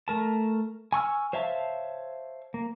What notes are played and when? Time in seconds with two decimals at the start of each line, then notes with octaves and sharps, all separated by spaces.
0.08 A3 A#4 A5
0.93 G#5 C#6 E6 F6
1.33 C5 C#5 E5 F5 A5
2.54 A#3